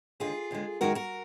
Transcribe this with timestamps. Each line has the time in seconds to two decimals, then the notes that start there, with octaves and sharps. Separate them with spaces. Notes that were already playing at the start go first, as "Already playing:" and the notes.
0.20 D#2 D3 G#3 F4 G#4
0.51 D#2 D3 G#3
0.81 F#2 D#3 G#3 F#4 A#4
0.95 F#4 A#4